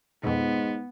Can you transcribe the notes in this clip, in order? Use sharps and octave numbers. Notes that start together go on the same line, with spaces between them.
F2 G#2 B2 B3